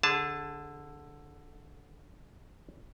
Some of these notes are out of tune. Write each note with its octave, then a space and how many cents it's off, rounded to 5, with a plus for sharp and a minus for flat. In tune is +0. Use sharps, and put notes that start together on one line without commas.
D3 +0 G#4 -25 A5 +0